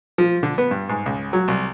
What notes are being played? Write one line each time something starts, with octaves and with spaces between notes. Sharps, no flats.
F3
D3
B3
G2
G#2
C#2
F#3
C2